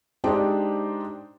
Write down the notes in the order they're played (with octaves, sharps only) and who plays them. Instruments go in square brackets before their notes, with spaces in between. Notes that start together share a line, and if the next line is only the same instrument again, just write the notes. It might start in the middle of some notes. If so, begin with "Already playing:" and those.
[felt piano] G#3 D4 D#4 G4 C5 D5